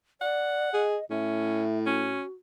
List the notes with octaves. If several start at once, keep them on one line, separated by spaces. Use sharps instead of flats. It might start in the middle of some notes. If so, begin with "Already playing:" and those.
D5 F#5
G#4 D#5
A2 C#4 E5
C#4 F#4